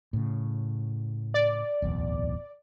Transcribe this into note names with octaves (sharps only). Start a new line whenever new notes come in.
A2 C#3
D5
D1 B1 E2